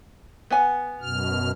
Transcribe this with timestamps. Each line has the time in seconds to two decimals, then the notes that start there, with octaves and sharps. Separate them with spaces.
0.51 B3 F#5 G#5
1.01 F#2 B2 F6